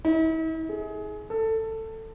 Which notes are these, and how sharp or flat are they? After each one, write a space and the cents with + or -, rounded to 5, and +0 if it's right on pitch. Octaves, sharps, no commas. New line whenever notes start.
E4 -45
G#4 +25
A4 +15